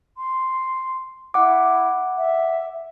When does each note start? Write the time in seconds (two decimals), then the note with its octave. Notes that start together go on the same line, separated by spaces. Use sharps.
0.17 C6
1.34 E4 F#5 D6
2.17 E5